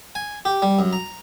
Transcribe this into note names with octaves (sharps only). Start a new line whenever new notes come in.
G#5
G4
G3
F#2
A#5